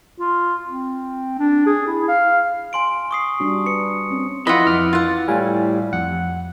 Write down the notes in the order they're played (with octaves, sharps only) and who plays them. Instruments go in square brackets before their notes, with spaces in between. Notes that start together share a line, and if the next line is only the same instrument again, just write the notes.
[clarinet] F4
C4
D4
G#4
E4
F5
[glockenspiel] G#5 C6 D7
C#6 D#6 C7
[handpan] G3 D4 F#4
[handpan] B4 [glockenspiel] C#7
[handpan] C4 C#4
[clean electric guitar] E3 [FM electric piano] F3 [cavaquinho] F4 B5 [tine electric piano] D#5 F#5
[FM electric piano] F2 D6 [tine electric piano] F6
[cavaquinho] F4 F#5 [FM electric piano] A6
[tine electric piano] A2 G3 [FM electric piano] F5 G#5
[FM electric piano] F2 [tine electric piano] F#5